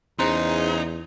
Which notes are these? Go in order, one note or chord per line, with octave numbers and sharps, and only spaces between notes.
E2 C#3 D#4 C5 A#5 C6